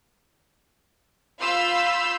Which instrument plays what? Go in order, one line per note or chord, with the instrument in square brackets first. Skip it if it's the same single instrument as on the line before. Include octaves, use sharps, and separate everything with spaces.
[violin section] F4 F5 B5 C6 E6 G6